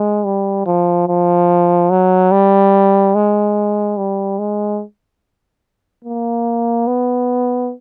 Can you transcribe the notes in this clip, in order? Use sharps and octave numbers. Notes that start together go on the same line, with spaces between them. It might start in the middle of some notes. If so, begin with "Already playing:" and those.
Already playing: G#3
G3
F3
F3
F#3
G3
G#3
G3
G#3
A#3
B3